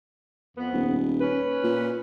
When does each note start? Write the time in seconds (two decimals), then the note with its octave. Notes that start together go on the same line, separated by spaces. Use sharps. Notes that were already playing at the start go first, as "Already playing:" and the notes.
0.58 F2 B3
0.73 D#1
1.21 C#4 B4
1.64 A#2